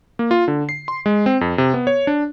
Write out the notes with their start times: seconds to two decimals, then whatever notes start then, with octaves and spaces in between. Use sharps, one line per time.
0.19 A#3
0.31 F4
0.48 D3
0.69 C7
0.88 C6
1.06 G#3
1.26 C4
1.41 F2
1.58 C3
1.74 B3
1.87 C#5
2.07 D4